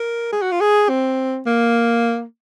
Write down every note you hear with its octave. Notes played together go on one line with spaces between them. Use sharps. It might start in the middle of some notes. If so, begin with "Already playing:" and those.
Already playing: A#4
G#4
F#4
F4
G#4
C4
A#3